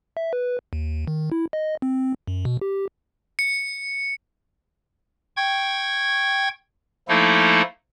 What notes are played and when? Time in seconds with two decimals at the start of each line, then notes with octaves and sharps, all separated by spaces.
0.17 E5
0.33 B4
0.73 D#2
1.07 D#3
1.32 E4
1.53 D#5
1.82 C4
2.27 F#2
2.45 B2
2.61 G4
3.39 C#7
5.37 G5 C#6 G#6
7.09 F3 A3 A#3 D#4 E4 A4